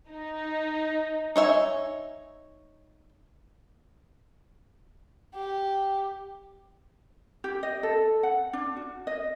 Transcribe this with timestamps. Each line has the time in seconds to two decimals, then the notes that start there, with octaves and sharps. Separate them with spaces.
0.10 D#4
1.36 D#4 C#5 E5 G#5
5.35 G4
7.44 G4
7.63 D#5
7.83 A4
8.23 F#5
8.53 D4
8.76 F#4
9.07 D#5